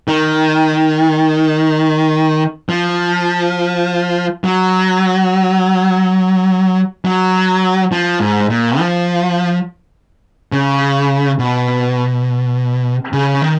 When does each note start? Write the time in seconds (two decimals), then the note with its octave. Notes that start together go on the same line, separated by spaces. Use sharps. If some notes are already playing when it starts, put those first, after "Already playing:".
0.08 D#3
2.69 F3
4.44 F#3
7.05 F#3
7.92 F3
8.20 G#2
8.50 A#2
8.79 F3
10.52 C#3
11.39 B2
13.13 C#3
13.42 D#3